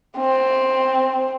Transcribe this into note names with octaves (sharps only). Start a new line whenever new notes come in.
C4